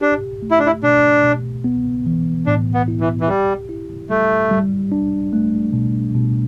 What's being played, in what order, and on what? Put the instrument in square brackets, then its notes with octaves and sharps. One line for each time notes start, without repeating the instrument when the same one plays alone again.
[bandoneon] D4 [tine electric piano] G4
[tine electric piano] A3
[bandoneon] E4
D4
E4
[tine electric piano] B2 [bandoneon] D4
[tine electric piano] B2
B3
E3
[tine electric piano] A2 [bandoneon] D4
[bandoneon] B3
[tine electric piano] E4
[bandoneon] E3
E3
[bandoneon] G3 [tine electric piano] G4
[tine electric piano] E4
[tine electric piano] G3 [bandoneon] A3
[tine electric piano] G3
D4
A3
B2
B2